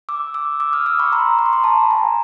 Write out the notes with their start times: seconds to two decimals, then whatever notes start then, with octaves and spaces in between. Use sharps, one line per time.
0.09 D6 E6
0.34 D6 E6
0.60 D6 E6
0.73 D#6 F6
0.86 D6 E6
0.99 B5 C#6
1.12 A#5 C6
1.39 C6
1.46 C#6
1.53 A#5 C6
1.64 A5 B5
1.91 G#5 A#5